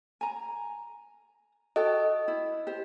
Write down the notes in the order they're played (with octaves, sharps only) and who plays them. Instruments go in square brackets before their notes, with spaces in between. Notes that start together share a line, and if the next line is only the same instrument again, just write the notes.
[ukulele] G#5 A#5
[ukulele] F#4 A4 G5 [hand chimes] D#5
[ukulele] E4
G4 C5